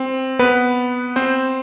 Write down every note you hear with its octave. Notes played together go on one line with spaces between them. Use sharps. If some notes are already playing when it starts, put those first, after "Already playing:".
Already playing: C4
B3 B4
C4 C5